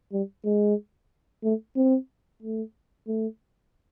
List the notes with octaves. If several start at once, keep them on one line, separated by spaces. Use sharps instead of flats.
G3
G#3
A3
C4
A3
A3